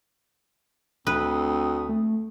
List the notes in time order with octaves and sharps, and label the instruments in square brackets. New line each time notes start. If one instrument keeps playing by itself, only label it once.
[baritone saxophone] D2 [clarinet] C4 [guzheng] B4 [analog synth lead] D#6
[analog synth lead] A3